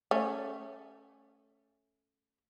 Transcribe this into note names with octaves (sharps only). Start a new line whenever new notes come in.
A3 C#4